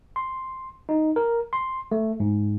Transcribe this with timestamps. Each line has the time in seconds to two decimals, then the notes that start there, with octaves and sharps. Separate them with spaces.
0.16 C6
0.89 D#4
1.16 A#4
1.53 C6
1.91 A3
2.20 G#2